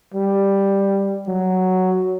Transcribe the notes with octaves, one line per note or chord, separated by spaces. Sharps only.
G3
F#3